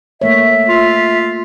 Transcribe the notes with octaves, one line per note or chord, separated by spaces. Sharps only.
A3 A#3 C#5 E5
F4